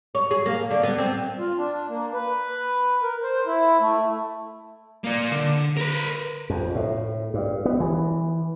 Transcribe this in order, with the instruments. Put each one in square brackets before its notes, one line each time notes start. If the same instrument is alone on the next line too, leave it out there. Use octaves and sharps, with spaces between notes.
[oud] C#5
G#4
A#3
D3
B3
C4
[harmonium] F4
D4
A#3
B4
A#4
C5
E4
A3
[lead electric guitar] A#3 D5
D3
A#4 B4
[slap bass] F2
A2
G2
B3
E3